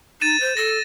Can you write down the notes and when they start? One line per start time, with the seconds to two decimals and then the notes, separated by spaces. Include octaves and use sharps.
0.21 D#4 A6 D#7 E7
0.40 C5
0.57 A4 A#6